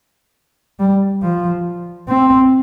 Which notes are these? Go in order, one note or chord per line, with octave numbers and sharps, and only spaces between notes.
G3
F3
C4